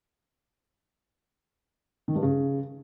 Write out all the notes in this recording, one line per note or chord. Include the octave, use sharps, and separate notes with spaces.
D#3
G2
C#3